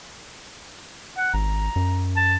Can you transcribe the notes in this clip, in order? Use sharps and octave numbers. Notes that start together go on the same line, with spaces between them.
F#5
G#1 A#5
F#2
A5